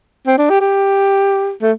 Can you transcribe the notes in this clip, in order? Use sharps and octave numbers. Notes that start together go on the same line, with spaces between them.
C4
D4
G4
G4
A3